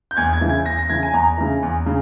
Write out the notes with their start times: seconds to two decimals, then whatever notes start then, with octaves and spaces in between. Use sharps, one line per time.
0.11 G6
0.17 E2 G#6
0.33 G#6
0.41 C#3 E3
0.49 G#6
0.65 E2 A#6
0.78 A#6
0.89 C#3 E3 G#6
1.03 G#5
1.13 E2 A#5
1.38 C#3 E3
1.63 E2
1.86 C#3